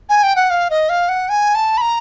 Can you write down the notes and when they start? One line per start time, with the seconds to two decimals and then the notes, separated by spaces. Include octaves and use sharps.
0.09 G#5
0.23 G5
0.36 F#5
0.50 F5
0.70 D#5
0.89 F5
1.09 F#5
1.29 G#5
1.55 A5
1.77 B5
1.81 A#5